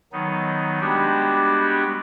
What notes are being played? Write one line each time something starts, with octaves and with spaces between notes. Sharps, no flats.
D#3 F#3 B3 D#4
G3 G#3 B3 D4 F#4 G4